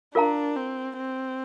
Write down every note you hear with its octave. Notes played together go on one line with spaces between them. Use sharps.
D4 F4 A#4 F5 A#5
C4
C4